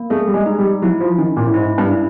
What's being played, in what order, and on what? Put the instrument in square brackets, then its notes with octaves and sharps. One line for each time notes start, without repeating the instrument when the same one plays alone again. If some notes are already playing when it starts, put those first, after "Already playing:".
Already playing: [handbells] A#3
[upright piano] A3 [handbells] G#4
[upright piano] G3
G#3
[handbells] D#4
[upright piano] G3
[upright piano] F#3 [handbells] E4
[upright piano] F3
[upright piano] D#3 [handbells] C#4
[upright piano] A#2
A2
[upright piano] G#2 [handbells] E4
[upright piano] G2
[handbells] E4